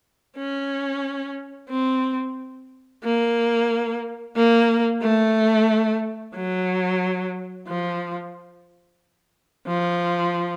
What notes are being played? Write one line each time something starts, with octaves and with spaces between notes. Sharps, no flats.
C#4
C4
A#3
A#3
A3
F#3
F3
F3